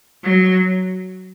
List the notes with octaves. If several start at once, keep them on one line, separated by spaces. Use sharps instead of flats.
F#3